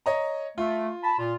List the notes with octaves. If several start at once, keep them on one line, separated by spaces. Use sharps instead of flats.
C#5 D#5 A#5
A3 F4
A5 B5
A#2 F4